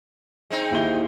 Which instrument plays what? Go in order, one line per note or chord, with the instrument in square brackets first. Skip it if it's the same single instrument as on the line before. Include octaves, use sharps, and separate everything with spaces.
[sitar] G#3 C4 D#4
[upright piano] D#2 E4 G7